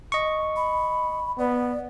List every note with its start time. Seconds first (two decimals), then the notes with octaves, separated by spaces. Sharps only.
0.12 D#5 C#6
0.56 B5
1.39 B3 D5